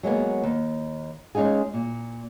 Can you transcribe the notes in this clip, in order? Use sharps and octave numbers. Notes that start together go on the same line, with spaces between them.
F#3 G#3 A#3 B3
D#2
G#3 C#4 D#4 F4 G#4
A#2